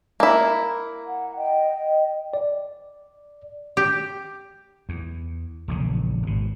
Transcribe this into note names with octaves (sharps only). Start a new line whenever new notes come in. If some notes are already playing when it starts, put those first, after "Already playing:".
A#3 E4
F#5
D#5 G5
D5
G4
E2
E1 A#1 C#3
G#1 B2